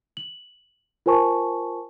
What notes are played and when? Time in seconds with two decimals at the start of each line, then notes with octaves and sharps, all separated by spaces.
0.17 F#7
1.06 F4 A#4 C5 G#5 A5 C#6